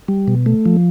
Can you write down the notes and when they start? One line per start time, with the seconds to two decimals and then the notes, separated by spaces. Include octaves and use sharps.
0.08 G3
0.28 B2
0.46 A3
0.66 F3